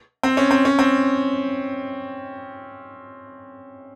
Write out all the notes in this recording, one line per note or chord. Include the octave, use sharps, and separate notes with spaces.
C4
C#4
C4
C#4
C4